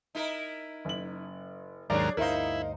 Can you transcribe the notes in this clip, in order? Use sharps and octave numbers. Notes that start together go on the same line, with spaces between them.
D#4 E4 A#4
F#1 F#7
D#2 G#2 F#3 D4 G#4 A#4 C#5 D5
D2 G2 D#4 E4 A#4 C5 F5